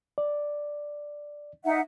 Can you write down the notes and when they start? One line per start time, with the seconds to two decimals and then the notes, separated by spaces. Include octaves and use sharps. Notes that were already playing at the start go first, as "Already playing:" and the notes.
0.18 D5
1.65 D#4 E5 F#5